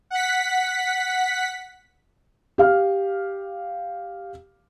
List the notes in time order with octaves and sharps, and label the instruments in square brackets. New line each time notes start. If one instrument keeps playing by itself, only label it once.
[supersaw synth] F#5 B6
[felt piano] G4 F5 F6